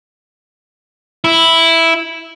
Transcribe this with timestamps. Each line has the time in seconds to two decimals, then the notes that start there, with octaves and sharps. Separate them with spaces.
1.24 E4